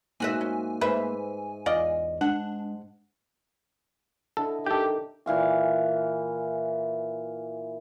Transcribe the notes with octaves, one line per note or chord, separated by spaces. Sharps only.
G#2 A#3 F#4 E5 G#5
C#4
G#2 B4 C5 E5
E2 F4 D5 D#5
G#3 D4 F#5
D3 E4 A4 D#5
D#3 G4 A4 G5
A#2 E3 F5 G#5